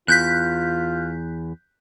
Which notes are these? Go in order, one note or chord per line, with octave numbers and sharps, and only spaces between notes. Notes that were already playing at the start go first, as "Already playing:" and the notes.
E2 F4 F#6 G6 B6